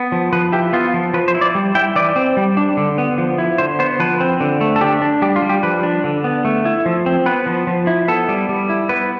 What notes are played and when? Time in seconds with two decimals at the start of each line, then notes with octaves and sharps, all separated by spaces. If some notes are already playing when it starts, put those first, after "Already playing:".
Already playing: B3
0.12 F3
0.33 F3 B4
0.52 E4 G4
0.73 B3 F4
0.94 F3
1.14 F3 B4
1.28 C5
1.35 E4
1.41 D5
1.55 G3
1.75 E4 G5
1.96 E3 D5
2.16 C4
2.37 G3
2.57 D4
2.77 D3
2.98 B3
3.18 F3
3.38 E4
3.58 D3 C5
3.79 B3 C5
4.00 F3 B4
4.20 C4
4.40 D3
4.61 A3
4.76 A4
4.81 D4 G4
5.02 D4
5.22 G3 G4
5.36 F4
5.42 G3
5.49 G4
5.63 F3 B4
5.83 D4
6.04 D3
6.24 B3
6.45 A3
6.65 E4
6.86 F3
7.06 C4
7.26 B3 B4
7.46 F3
7.67 F3
7.87 E4
8.08 B3 A4
8.29 G3
8.49 G3
8.69 E4
8.89 B3 B4